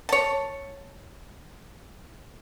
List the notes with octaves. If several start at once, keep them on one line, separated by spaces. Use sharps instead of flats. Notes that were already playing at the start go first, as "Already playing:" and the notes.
C#5 A5